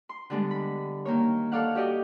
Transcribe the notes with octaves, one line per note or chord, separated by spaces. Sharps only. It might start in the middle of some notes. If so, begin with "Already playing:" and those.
C6
D3 G3 G#3 B3
B5
D#3 A#3 C#5
A4 C#5 D5 F5 F#5
F#4 G4 D5 D#5 G5